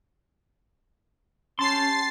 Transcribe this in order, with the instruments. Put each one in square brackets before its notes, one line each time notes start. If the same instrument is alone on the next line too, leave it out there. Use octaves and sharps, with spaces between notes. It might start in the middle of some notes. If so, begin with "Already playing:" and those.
[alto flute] C#4 [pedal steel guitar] G4 A5 C6 [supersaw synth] A6 C7